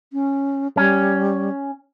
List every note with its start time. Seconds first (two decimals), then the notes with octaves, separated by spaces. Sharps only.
0.13 C#4
0.77 G3 C#4